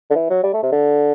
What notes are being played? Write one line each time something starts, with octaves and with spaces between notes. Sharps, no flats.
D3
E3
F#3
G3
A3
C3
D3